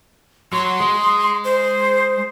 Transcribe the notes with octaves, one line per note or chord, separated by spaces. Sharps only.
F#3 C#5 C6
G#3
C5